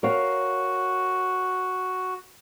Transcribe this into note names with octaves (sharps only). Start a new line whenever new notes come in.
F#4 A#4 C#5 F5